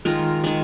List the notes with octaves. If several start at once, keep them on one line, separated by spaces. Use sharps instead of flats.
D#3 G#3 F4 A#4
D#3 G#3